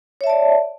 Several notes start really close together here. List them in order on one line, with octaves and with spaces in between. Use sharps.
C#5 E5 A5 D5